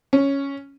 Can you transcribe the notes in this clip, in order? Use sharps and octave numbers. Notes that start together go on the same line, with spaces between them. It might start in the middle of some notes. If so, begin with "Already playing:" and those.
C#4